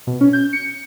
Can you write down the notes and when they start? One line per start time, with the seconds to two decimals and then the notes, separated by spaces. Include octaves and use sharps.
0.07 B2
0.21 C#4
0.33 G6
0.53 C#7